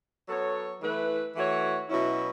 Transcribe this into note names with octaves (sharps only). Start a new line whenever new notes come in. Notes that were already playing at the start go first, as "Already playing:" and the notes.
F#3 B3 A4 C#5
E3 A3 E4 B4
E3 A3 F#4 C#5
B2 F#3 C#4 E4